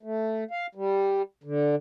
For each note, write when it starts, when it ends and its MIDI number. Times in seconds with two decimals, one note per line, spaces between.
0.03 0.44 57
0.51 0.66 77
0.75 1.22 55
1.44 1.75 50